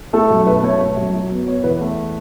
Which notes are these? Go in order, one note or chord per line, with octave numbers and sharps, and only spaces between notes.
A3 A4
F#2
B2 B4
A3 C#5
A3
F#2
F#3
B3
B3 C#5
E2 B4
A3